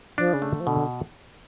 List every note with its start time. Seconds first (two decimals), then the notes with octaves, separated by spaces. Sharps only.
0.18 F3 D4
0.34 C#3
0.42 A3
0.50 D3
0.60 F3
0.67 B2 D3